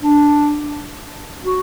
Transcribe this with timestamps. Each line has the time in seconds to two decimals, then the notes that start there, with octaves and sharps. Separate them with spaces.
0.02 D4
1.45 F#4